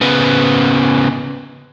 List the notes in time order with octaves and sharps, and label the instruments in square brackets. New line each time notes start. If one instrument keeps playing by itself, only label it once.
[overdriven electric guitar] C#3 B3